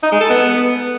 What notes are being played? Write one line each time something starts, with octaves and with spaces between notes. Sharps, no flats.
D#4
G#3
A4
B3